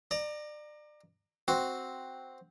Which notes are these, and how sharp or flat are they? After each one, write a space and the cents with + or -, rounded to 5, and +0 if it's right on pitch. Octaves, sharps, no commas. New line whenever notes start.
D5 +30 A#5 +0
C4 +0 F#4 +0